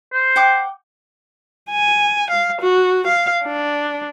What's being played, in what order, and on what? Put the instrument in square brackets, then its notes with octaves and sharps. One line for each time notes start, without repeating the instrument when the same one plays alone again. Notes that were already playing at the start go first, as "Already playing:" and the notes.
[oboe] C5
[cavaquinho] F#5 G5 D6
[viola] G#5
F5
F#4
F5
D4